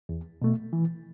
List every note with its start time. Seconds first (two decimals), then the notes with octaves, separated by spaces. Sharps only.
0.09 E2
0.42 B2 A3
0.73 E3